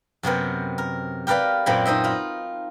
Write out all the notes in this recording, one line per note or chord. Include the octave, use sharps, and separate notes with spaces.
F#2 C3 B3 A#4
A#4
G4 A#4 B4 D5 F5
F#2 A#2 A#3 C4 G#5 B5
D#4 C5 D#5 E5
F4 B5